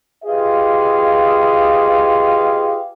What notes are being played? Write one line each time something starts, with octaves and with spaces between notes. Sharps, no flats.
F4 G4 G#4 B4 D#5 F5